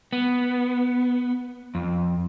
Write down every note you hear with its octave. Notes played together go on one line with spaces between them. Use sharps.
B3
F2